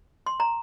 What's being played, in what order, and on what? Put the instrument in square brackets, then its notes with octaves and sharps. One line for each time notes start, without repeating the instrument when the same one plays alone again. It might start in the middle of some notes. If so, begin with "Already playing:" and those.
[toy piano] C6
A#5